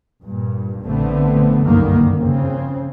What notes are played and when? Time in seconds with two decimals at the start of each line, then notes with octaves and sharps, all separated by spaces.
0.23 G2 A#2
0.85 A#1 D3 A3 B3 C4
1.63 F#1 C2 G2 D3 D#3 A#3
2.16 F2 C#3 C4